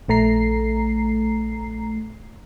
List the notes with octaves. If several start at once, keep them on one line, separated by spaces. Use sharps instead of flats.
A#1 A3 A#5 C7